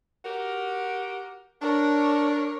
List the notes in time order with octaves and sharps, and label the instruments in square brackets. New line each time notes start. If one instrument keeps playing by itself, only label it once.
[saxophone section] F#4 G4 A#4
[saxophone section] D4 [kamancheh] A#4 C#5